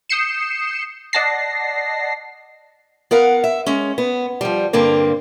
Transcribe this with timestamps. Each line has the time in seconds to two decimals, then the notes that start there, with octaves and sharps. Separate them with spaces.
0.10 D#6 G6 C7 C#7 E7
1.13 D5 D#5 F#5 A5 A#6 C7
3.11 B3 A#4 F5 F#5
3.44 E5
3.66 G#3 C#4
3.98 B3
4.41 F3 G3
4.73 G2 D3 A#3 C4